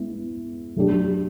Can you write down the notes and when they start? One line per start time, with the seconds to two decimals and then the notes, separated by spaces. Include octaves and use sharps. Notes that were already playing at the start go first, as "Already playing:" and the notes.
Already playing: G#3 B3 E4
0.76 F#3 A3 D4 G4